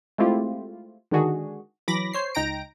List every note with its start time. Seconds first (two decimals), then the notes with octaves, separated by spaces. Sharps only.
0.18 G#3 A3 C4 E4 F4 G4
1.11 D3 D#3 G#3 D4 F#4 G#4
1.88 E3 F#3 B5 D6 A#6
2.13 C5 C#5 C7
2.35 C#2 D#4 G5 A#5 A#6 D7